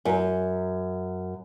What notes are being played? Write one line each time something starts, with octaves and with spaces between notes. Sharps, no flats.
F#2